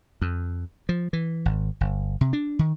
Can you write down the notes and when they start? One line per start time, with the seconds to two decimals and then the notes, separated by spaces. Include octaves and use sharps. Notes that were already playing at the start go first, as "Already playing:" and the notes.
0.22 F2
0.89 F3
1.13 E3
1.45 G#1
1.81 G1
2.21 C3
2.33 D4
2.59 D#3